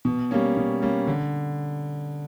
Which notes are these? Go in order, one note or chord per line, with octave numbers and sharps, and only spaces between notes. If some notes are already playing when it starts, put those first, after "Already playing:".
B2
G3 A#3 C#4
B2
G3 A#3 C#4
D3